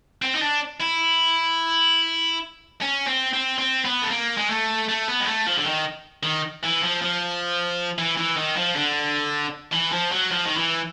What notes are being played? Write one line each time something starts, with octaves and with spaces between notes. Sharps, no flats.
C4
D#4
D4
E4
C#4
C4
C4
C4
B3
A3
A#3
G#3
A3
A3
B3
G#3
A3
F3
D3
D#3
D#3
E3
F3
F3
E3
E3
D#3
F3
D3
E3
F3
F#3
F3
D#3
E3